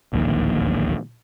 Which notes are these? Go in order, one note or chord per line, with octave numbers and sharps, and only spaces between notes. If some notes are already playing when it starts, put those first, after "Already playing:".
D1 A#1 D#2